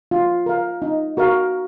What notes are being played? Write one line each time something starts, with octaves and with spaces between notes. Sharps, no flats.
F4
A#4 F5
D#4
F#4 A#4 F5